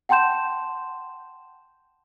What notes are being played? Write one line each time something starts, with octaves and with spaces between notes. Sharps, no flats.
F#5 G5 A5 C6 G6 E7